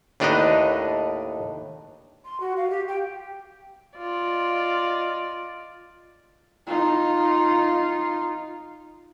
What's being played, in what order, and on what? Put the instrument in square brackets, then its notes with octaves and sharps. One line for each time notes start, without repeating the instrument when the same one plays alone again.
[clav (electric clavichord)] D#2 A2 D4 D#4 B4 D#5
[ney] C6
F#4
F5
G4
G5
[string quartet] F4 D5 D#5
[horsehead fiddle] D#4 F4